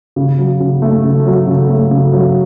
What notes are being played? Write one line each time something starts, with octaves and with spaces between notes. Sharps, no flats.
C#3
F#3
C#3
A3
C#3
F#3
C#3
A3
C#3
F#3